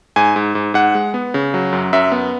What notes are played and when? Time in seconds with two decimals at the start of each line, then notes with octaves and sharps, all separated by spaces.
0.16 G#2 G#5
0.36 G#2
0.55 G#2
0.74 G#2 F#5
0.95 G#3
1.14 B3
1.34 C#3
1.54 F#3
1.73 F#2
1.93 F#2 E5
2.12 B3